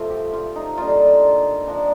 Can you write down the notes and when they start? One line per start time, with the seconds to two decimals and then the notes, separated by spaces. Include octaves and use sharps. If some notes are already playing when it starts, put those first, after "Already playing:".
Already playing: C3 F3 A3 C4 F4
0.10 G4
0.34 F4
0.56 D#4
0.78 D3 G3 A#3 D#4 F4
1.67 F3 A#3 D4